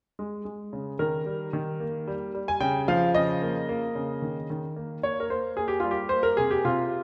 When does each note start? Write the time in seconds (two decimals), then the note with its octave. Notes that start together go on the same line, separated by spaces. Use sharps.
0.19 G#3
0.45 G#3
0.73 C#3
0.99 D#3 A#4
1.26 G3
1.53 D#3
1.80 A#3
2.07 G3
2.35 G3
2.48 G#5
2.60 C#3 G5
2.88 F3 F5
3.14 C#3 D#5
3.42 A#3
3.69 A#3
3.95 C#3
4.22 D#3
4.50 D#3
4.76 A#3
5.03 A#3 C#5
5.20 A#4
5.30 A#3 C5
5.57 A#3 G#4
5.68 G4
5.80 G3 F4
5.91 G4
6.09 A#3 C5
6.23 A#4
6.37 C3 G#4
6.51 G4
6.65 C3 F4